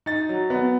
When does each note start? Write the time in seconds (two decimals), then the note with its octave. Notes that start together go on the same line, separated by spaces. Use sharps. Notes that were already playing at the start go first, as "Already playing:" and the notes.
0.06 D#4 A6
0.29 F#3
0.50 B3